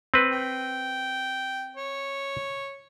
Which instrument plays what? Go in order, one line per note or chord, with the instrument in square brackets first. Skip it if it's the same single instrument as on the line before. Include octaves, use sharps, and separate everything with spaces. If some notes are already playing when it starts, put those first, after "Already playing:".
[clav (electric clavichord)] C4 B4
[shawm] G5
C#5